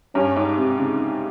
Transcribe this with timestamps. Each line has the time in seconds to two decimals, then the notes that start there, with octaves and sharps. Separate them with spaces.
0.15 G2 C#4
0.36 G#2
0.57 C3
0.78 C#3